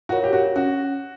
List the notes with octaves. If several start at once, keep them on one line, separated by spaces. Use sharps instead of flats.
F4 F#4 A#4 C#5
G4
F#4
C#4 F#4